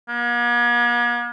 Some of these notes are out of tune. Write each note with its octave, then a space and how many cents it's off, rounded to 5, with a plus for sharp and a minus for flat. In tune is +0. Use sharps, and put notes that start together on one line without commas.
A#3 +45